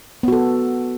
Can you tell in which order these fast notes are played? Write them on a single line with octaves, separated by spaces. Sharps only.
B3 F#4 A4